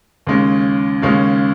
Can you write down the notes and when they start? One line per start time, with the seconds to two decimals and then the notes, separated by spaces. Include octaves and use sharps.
0.27 D#2 C#3 G#3 C#4
1.02 D#2 C#3 G#3 C#4